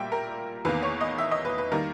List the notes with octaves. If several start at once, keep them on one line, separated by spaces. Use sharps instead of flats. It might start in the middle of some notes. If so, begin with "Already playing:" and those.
Already playing: A#2 G3 A#3 E5 G5
A#4
E2 D#3 A#3 B4
C#5
D#5
E5
D#5
B4
B4
D#3 G3 A#3 A#4